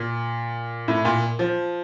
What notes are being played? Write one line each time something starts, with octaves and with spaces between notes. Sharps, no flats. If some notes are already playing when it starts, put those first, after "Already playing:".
Already playing: A#2
A2
A#2
F3